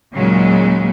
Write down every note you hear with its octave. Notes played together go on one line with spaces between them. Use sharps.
D#2 A#2 C#3 F#3 G#3